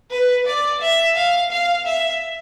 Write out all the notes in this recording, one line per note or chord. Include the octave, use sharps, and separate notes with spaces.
B4
D5
E5
F5
F5
E5